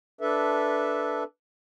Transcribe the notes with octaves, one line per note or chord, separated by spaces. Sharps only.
D4 A4 B4 E5